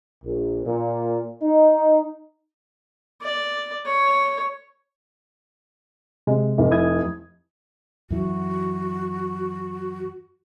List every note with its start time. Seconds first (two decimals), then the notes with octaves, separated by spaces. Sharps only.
0.24 A#1
0.65 A#2
1.42 D#4
3.21 D5
3.86 C#5
6.27 C3 G#3
6.58 F1
6.71 E4 D#6 G#6
8.10 F#2 E3 F#4